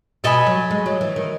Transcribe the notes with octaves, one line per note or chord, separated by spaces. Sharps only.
B2 A4 D#5 G#5 B5
F#3
G#3
F#3
E3
D#3